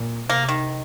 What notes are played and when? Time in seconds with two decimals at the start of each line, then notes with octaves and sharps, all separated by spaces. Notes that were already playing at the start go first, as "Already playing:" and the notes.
Already playing: A#2
0.29 C3 A#3
0.49 D#3